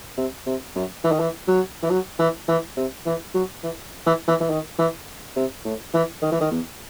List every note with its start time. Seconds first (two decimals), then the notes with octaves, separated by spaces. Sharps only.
0.17 C3
0.46 C3
0.75 F#2
1.04 E3
1.12 D#3
1.20 E3
1.48 F#3
1.83 E3
1.90 F#3
2.19 E3
2.48 E3
2.77 C3
3.06 E3
3.34 F#3
3.63 E3
4.06 E3
4.28 E3
4.41 E3
4.50 D#3
4.78 E3
5.36 C3
5.65 A2
5.94 E3
6.22 D#3
6.32 E3
6.41 D#3
6.51 E2